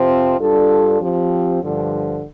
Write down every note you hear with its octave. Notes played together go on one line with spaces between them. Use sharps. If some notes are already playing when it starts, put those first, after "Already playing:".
Already playing: F2 C3 F3 C4
G2 G3 D4 F4 A4
F3 C4 G4
G2 D3 F3